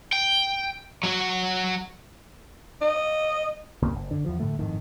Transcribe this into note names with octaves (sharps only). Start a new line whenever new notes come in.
G5
F#3 F#4
D#5
C2 F2 C#3 A#3
F#1
D3
E2 F3
A2 D3 A3
G#1 F2 A2 D#3